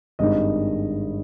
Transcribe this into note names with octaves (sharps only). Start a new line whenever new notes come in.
G#1 G2 D#3 G#3 D#5